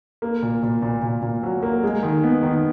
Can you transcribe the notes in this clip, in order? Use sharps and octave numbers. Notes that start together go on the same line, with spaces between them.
A#3
A#2
A#2
A#2
A#2
A#2
F#3
A#3
G#3
D#3
B3
D#3